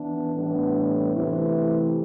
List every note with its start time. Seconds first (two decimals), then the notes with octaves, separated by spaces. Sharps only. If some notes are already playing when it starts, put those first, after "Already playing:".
Already playing: E3 B3 D4
0.34 A2 E3 G3 B3 D4
1.11 C3 E3 A3 E4